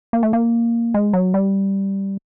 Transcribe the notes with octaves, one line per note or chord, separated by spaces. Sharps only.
A#3
A3
A#3
G#3
F#3
G3